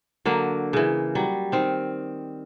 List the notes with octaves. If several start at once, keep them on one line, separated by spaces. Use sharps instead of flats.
D3 F#3 A#3
C#3 E3
F#3 G3
D#3 C4